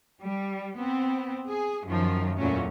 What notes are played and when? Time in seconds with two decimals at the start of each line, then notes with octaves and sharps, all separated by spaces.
0.22 G3
0.77 B3 C4
1.47 G#4
1.86 F#2 D#3 F3
2.38 E2 A#2 F#3 A3 C#4